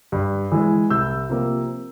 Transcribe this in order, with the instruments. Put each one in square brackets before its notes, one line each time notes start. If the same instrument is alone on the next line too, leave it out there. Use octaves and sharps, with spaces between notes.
[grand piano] G2
E3 G#3
C2 E6 G6
C3 F3 A#3